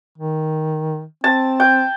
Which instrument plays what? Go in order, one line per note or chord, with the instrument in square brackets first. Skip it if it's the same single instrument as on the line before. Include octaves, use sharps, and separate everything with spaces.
[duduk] D#3
[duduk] C4 [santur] A5
[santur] G5